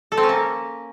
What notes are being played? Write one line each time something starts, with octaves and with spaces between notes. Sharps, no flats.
A4
C4
C#4
A#3